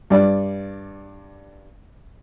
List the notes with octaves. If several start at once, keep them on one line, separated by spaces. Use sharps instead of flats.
G2 D5